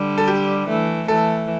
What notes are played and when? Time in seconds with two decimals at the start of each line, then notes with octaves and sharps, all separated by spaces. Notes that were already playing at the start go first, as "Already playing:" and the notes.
Already playing: D3 G3
0.18 A4
0.27 G4
0.68 E3 A3
1.08 E3 A3 A4